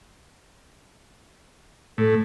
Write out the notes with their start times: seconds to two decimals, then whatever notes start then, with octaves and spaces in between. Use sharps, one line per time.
1.98 A2 A4